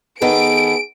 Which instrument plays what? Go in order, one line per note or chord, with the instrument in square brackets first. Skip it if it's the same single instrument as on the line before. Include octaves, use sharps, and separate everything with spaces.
[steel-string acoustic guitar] D#3 B3 A4 [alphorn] G#4 [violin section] D7